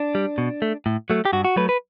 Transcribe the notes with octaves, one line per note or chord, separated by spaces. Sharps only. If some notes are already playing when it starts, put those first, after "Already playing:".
Already playing: D4
G3
B2
A3
A2
F#3 A3
G4
G2 F#4
F#4
F#3 A3 B4
B4